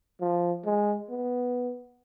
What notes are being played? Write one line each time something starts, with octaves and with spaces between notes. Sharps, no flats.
F3
G#3
B3